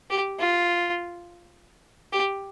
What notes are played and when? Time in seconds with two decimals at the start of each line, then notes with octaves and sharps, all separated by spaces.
0.10 G4
0.39 F4
2.13 G4